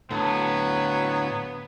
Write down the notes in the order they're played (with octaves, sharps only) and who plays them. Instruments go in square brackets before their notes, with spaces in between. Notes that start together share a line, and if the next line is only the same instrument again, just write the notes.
[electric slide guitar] A2 D3 [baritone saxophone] F#3 [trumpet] B3 [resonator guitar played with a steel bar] A4